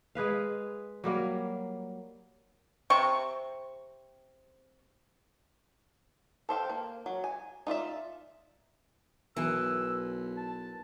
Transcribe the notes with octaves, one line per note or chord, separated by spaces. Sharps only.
G#3 G#4 B4 F5
F#3 G3 A#3
C3 C4 C#6
A4 C5 F5 G5
A#3
F#3
G#5
D#4 F4 D5 E5
B1 E3 A#4 G#5 E6
A5